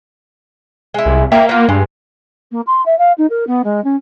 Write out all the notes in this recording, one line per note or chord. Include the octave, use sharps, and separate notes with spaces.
G#3 E4
C2
A#3 E5 G5 A#5
B3 F4
G2 G#3
A#3
C6
E5
F5
D#4
A#4
B3
G#3
C#4